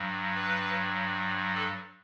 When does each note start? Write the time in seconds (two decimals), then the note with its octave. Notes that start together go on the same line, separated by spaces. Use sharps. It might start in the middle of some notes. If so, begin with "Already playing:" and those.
Already playing: G2 F#3
0.35 B4
1.54 A4